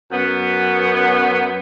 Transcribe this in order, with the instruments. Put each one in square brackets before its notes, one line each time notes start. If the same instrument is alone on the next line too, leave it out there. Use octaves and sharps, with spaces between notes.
[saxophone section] F#2 B3